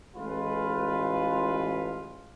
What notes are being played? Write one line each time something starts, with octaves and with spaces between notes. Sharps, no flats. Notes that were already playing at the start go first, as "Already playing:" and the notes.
A1 G#3 F4 B4